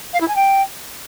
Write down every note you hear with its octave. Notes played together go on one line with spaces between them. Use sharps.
F5
E4
G#5
G5